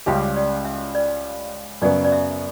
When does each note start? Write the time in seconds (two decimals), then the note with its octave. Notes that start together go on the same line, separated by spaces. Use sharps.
0.06 C#2 C#3 G3 C#4 G4 E5
0.36 D5
0.65 E5
0.95 D5
1.82 F#2 C#3 F#3 B3 D5
2.05 D5
2.12 E5